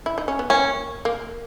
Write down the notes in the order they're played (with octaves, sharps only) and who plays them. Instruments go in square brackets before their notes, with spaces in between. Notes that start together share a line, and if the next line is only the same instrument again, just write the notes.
[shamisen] E4
D#4
C#4
B3
[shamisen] A#3 [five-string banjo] C#4
[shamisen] A#3